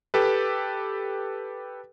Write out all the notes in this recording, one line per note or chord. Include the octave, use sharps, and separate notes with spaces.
G4 A4 B4